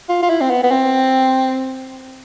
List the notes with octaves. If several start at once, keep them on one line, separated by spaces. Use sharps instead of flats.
F4
F4
E4
C4
B3
B3
C4